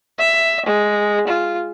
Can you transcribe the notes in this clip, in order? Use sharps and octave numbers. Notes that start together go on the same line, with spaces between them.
E5
G#3
F4